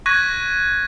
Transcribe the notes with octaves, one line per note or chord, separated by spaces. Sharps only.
C#6 F#6 G#6 A#6 B6 D#7